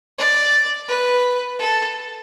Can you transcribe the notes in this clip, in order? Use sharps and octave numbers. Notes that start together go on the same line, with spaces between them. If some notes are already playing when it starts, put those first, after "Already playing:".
D5
B4
A4